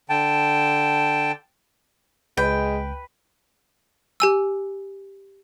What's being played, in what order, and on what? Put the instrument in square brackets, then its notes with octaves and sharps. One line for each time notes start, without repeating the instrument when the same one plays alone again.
[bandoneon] D3 G5 A5
[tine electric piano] C#2 [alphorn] G#3 [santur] B4 [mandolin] G5
[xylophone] G4 G#5 E6